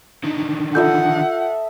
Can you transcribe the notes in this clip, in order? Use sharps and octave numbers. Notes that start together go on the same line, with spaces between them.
D3 D#3
F4 A4 D#5 E5 F#5 G6